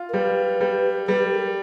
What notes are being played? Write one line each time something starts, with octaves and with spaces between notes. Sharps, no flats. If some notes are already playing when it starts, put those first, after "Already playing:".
Already playing: F4
A#4
G3 B4
G3
G3 B4
A4
A#4